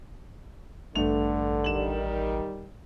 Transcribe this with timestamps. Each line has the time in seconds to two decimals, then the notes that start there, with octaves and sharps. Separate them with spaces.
0.95 A1 G2 D3 A3 F7
1.64 D#3 G3 E7 F#7